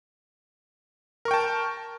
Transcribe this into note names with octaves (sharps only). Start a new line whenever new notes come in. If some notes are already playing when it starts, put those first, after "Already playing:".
A#4 G5 A5 C#6